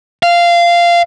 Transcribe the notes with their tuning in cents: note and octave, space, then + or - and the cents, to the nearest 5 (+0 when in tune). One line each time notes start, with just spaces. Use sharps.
F5 -15